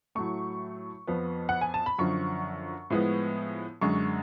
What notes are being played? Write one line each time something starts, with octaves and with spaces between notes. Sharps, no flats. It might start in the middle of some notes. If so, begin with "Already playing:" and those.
A2 F#3 A3 C#6
F2 F3 B3
F#5
G#5
A5
B5
F#2 D3 F3 C#6
A2 F3 G#3 B3
F#2 D3 G#3 C#6